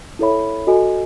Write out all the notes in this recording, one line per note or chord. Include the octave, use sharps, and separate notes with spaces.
E4 A4 C#5 E5 B5
F#4 A4 D#5 G#5